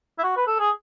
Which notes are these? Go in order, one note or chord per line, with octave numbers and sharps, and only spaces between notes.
E4
F#4
B4
A4
G#4